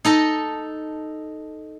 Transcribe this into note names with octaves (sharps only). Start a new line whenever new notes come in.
D#4 A4 D#5